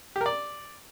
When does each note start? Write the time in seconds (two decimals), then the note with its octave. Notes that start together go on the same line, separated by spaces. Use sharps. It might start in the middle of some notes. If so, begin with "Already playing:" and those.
0.16 G4
0.21 A#4
0.26 D5